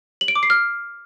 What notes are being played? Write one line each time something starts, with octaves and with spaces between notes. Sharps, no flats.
F#7
D7
D6
C7
F6